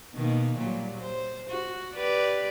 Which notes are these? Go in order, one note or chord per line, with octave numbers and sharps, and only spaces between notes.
B2 D#3 A#3
A#2 F#3 G3
C5
F#4
G4 B4 D5